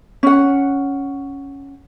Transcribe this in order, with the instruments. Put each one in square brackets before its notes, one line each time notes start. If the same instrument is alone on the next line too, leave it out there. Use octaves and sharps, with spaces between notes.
[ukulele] C#4 F#5